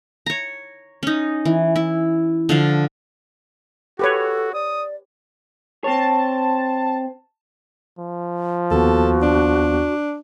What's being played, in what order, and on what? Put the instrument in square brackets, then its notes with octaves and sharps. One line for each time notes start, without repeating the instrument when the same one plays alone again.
[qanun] C#5 A#5
C#4 D#4
E3
E4
D3 F3 F5
[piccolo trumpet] F#4 [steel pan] G4 B4 C#5 [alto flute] A4
[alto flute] D5 [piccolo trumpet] D#6
[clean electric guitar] C4 C#5 [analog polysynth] A5
[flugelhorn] F3
[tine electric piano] D#2 B3 [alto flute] F#4 [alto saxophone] A4
[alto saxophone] D4